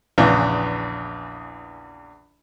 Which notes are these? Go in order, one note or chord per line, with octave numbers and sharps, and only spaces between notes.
A#1 E2 C#3 E3